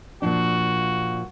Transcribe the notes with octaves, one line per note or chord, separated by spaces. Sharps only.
A#2 F3 D4 F#4